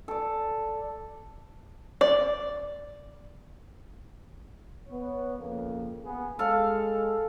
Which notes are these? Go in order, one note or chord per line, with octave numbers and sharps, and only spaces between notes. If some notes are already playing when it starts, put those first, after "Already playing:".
A4 D5
D5
B3 C#5
F2 C#3 A#3
B3 G#4
G#3 A4 F5